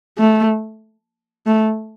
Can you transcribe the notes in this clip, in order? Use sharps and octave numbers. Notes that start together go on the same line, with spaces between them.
A3
A3